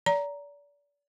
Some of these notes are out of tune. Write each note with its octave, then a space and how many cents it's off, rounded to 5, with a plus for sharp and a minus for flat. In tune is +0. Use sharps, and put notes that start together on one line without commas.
D5 -30 A#5 +0